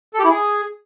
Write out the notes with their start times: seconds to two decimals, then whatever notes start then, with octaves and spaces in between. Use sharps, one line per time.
0.14 A4
0.19 G4
0.25 E4
0.30 G#4